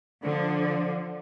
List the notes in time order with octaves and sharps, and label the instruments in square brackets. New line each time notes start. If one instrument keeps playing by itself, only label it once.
[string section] D3 F3